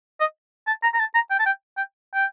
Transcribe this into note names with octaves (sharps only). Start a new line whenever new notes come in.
D#5
A5
A#5
A#5
A5
A#5
G5
A5
G5
G5
G5